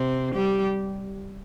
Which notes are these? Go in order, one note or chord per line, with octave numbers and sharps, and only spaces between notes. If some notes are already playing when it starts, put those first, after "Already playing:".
Already playing: C3 C4
G3 G4